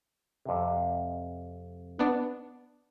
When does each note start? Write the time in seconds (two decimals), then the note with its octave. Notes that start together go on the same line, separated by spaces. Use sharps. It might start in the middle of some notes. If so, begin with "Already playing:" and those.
0.45 F2 C3
1.99 B3 D4